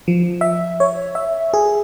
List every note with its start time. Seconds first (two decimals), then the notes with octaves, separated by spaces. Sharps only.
0.08 F3
0.41 E5
0.80 C#5
1.15 E5
1.54 G#4